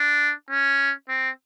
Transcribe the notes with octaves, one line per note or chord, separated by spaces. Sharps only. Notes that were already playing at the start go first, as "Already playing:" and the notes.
Already playing: D4
C#4
C4